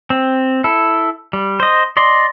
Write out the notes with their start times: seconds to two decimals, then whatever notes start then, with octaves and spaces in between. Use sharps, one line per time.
0.10 C4
0.64 E4 A4
1.33 G3
1.60 C5 D#5
1.97 D5 D#5 C6